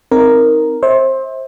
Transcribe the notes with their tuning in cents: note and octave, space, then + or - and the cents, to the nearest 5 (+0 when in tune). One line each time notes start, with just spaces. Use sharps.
C4 +0 D#4 +15 A#4 +0
C5 +25 E5 -30